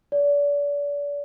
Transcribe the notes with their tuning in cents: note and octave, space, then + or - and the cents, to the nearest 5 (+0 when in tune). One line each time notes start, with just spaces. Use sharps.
D5 -35